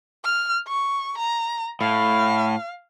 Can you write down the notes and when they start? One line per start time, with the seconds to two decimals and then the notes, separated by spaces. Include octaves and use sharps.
0.24 F6
0.68 C#6
1.18 A#5
1.81 A2 F5